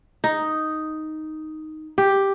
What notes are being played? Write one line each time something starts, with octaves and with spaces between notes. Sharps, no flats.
D#4
G4